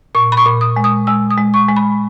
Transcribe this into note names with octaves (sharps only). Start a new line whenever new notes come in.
A#2 C#6
B5
C#6
A#2
D#6
G#3
D#6
G#3 E6
D#6
G#3
C#6
G#3
B5